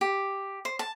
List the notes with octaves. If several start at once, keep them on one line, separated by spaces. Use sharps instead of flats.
G4
C5
A5